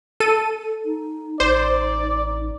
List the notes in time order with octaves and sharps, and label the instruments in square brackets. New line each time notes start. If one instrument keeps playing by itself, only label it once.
[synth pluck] A4 D#7
[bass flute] D#4
[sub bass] A1 [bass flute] D#4 [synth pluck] C5 [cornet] D5